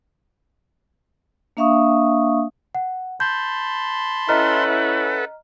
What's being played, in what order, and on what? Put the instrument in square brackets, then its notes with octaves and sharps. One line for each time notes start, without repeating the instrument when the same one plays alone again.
[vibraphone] A#3 D4 E5 F5 C#6 D#6
[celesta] F#5
[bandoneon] A5 B5 C6 [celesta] G6
[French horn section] C#4 E4 [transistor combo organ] A4 B4 F#5 [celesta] D#5 A#5 F6